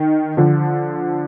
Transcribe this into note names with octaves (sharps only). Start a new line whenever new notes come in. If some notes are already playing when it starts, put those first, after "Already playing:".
Already playing: D#3
D3 F3